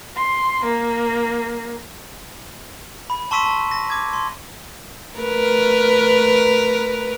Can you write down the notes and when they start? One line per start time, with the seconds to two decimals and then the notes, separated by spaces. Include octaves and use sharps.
0.15 C6
0.64 A#3
3.10 B5
3.31 A5 C6 C#6 E6 B6 D#7
3.46 A5
3.71 A#6
3.90 D6 G#6
4.13 C6
5.17 A3 A#4 B4